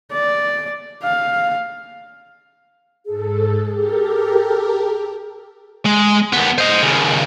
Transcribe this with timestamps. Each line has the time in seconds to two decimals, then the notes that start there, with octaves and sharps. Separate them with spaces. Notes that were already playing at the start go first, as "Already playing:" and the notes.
0.12 D5
1.03 F5
3.06 G#2 G#4 A4
3.70 G4 A4 A#4
5.86 G#3
6.33 D#2 B3
6.58 C5 D#5
6.82 D#2 C#3